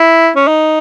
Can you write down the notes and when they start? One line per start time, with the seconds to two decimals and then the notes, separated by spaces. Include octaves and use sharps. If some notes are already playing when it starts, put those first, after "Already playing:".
Already playing: E4
0.36 C#4
0.48 D#4